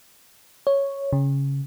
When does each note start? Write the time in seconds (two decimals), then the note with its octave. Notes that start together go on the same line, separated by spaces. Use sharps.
0.67 C#5
1.13 C#3